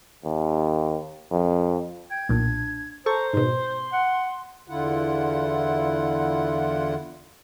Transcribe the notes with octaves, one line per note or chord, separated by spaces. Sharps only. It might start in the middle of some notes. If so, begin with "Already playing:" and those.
D#2
F2
G5 G#6
B1 A#2 D4
A4 C5 A#5 C#6
G#2 B2 C6
F#5
E2 D3 E4 F4 F#5